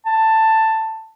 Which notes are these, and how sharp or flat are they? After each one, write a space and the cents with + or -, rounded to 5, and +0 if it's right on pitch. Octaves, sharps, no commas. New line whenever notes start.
A5 +10